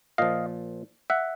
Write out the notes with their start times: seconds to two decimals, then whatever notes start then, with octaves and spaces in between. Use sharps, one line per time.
0.18 A#2 F3 D#5 F5
1.10 E5 F#5